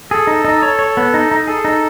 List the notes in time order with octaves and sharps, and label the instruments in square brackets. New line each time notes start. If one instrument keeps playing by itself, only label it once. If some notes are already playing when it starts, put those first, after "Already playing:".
[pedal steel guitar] G#4 [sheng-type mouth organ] A4
[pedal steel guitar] D#4
D#4
C#5
C#5
B3
D#4
D#4
[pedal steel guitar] G#4 [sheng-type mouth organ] A4
[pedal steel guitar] D#4